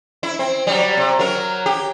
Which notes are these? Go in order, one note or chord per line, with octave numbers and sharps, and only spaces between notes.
E4
C4
F#3 G3
C3
F#3 A#4
G4